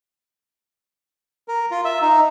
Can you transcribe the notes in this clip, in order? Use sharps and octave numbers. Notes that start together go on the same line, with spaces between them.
A#4
F4
E5
D#4